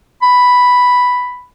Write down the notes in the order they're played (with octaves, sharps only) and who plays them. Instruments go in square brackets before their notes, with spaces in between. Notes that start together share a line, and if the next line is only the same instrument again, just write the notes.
[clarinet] B5